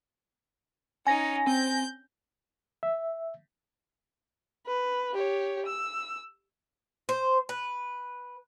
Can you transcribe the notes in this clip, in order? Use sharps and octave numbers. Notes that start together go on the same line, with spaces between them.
C#4 D#4 G#5 A#6
C4 G6
E5
B4
G4 C#5
E6
C5
B4